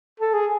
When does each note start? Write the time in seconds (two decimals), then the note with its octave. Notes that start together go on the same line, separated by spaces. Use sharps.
0.20 A4
0.34 G#4